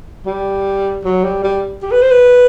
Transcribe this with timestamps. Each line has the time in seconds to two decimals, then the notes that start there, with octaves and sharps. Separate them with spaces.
0.26 G3
1.04 F#3
1.24 G3
1.44 G3
1.82 G4
1.92 B4
2.02 C5
2.11 B4